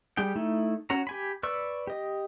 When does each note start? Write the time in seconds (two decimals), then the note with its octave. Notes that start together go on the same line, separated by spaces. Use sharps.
0.17 G3 G4 G#4 G5
0.36 A3 D#4 E4
0.90 C#4 F#4 C#5 A#5
1.07 G4 G#5 B5
1.43 B4 D5 C#6 E6
1.87 G4 D#5